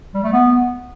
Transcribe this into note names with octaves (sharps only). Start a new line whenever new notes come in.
G3
A3
B3